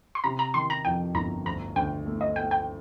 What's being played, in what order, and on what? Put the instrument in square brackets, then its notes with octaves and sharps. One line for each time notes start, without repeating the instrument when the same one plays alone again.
[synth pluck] C6
[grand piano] C3 [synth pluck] A#5
[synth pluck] A#5
[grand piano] D#3 [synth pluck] C6
[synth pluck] A#5
[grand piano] F2 [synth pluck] G5
[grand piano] G1 [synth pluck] A#5
[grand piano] D2 [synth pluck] A#5
[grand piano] D2 [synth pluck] G5
[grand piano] A3
[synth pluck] D#5
[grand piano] A3 [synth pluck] G5
[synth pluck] G5